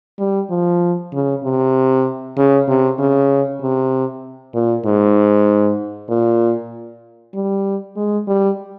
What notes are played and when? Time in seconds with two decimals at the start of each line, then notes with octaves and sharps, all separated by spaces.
0.19 G3
0.50 F3
1.13 C#3
1.44 C3
2.37 C#3
2.69 C3
2.98 C#3
3.62 C3
4.54 A#2
4.85 G#2
6.09 A#2
7.34 G3
7.96 G#3
8.28 G3